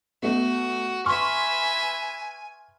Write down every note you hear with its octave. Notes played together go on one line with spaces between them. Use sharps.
A3 B3 F#4
B4 E5 G#5 C6 C#6 F6